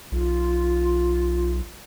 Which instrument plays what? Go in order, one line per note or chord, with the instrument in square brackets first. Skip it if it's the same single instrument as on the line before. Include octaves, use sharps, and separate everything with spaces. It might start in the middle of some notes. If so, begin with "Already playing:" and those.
[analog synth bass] B1 [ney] F4